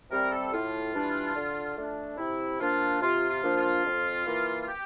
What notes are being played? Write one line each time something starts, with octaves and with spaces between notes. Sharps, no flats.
C3 G3 C4 A#4
A4
A2 F4
E3 G3 D4
D3
A3 D4
C3 E4
F3 A#3 D4 F4
C3 F4
F4
F3 A#3 D4
F4
F2
E3 A#3
F4
G4